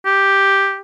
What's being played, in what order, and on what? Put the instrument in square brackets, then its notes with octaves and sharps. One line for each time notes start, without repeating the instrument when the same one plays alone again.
[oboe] G4